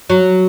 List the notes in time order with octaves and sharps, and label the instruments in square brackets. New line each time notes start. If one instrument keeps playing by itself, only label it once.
[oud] F#3